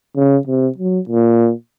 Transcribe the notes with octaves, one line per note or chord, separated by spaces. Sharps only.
C#3
C3
F#3
A#2